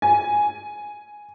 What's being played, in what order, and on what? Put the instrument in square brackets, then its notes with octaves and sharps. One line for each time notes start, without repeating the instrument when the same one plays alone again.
[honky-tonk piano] G#5